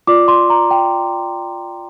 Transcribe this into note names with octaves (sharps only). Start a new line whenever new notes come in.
F4 D5 D6
C6
A#5
G5